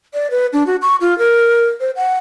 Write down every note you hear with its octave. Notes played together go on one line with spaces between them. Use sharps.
D5
B4
D4
F#4
C#6
F4
A#4
C5
F#5